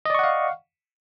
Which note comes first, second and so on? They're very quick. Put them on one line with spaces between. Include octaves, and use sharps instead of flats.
D#5 D5 C#6 F#5 F5